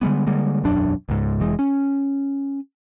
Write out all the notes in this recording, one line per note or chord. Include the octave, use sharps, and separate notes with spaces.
D3 G3 G#3 B3
D3 G3 G#3 A#3
E1 B1 F#2 D4
C#2 G#2
F1 E3 G#3
C#4